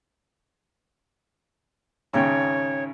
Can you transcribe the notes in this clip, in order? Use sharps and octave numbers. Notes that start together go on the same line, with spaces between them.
G#1 C#3 C#5 G5